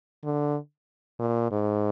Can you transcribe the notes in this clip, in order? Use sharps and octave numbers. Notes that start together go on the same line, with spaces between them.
D3
A#2
G#2